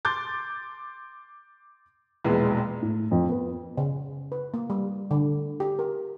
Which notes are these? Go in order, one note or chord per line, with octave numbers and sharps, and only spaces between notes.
C6 D6 G6 A6
E1 A#1 E3 G#3 B3
A2
F2
B3
C#3
B4
A#3
G3
D3
G4
A#4